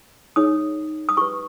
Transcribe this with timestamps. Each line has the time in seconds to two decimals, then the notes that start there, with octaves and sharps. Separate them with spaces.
0.36 D#4 G#4 C#5 D#6
1.09 D#6
1.17 G4 B4 C#6